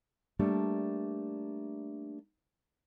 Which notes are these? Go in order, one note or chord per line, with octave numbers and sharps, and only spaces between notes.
G3 A3 A#3 D4